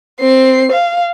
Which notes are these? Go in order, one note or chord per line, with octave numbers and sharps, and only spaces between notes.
C4 C7
F5